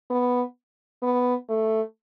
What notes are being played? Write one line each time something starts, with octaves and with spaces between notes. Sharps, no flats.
B3
B3
A3